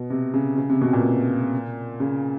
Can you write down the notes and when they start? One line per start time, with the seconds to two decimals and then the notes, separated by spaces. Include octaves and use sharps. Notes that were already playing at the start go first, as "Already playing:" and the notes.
Already playing: B2
0.10 C3
0.34 C#3
0.58 C#3
0.69 C3
0.81 B2
0.93 A#2
2.00 C#3